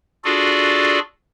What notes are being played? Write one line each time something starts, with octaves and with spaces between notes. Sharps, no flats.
D4 F4 F#4 G#4 A4 D5